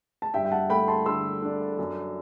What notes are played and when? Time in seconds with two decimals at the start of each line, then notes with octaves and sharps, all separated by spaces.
0.22 A5
0.34 G2 E5 G5
0.45 G5
0.52 F#5 A5
0.70 A3 G5 B5
0.88 A5 C6
1.06 D3 C6 E6
1.42 D4
1.79 F#2